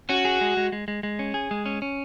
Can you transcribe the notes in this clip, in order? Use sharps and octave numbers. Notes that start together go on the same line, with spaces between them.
C#4 F#4
G#4
G#3
G#3
G#3
G#3
G#3
C#4
G#4
G#3
C#4
C#4